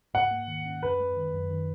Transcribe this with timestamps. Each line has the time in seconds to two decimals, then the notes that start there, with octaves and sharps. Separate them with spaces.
0.14 G#2 F#5
0.31 A#3
0.48 D#3
0.66 C#4
0.83 F#2 B4
1.00 G#3
1.17 D#3
1.34 F#2
1.51 D#3